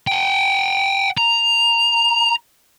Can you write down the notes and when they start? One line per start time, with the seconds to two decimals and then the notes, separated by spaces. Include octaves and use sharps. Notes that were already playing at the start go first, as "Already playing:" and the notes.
0.07 F#5 G5
1.17 A#5